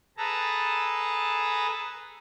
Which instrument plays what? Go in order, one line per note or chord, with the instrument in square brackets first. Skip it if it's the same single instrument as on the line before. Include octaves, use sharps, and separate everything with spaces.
[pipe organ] G#4 A4 B4 A5 A#5